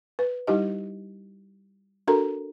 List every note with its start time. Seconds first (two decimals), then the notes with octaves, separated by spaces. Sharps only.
0.19 B4
0.47 G3 D#4 E4 G4 D#5
2.07 D4 F#4 A4 A#4 A#5